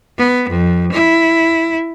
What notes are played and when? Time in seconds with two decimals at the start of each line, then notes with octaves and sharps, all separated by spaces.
0.18 B3
0.50 F2
0.92 E4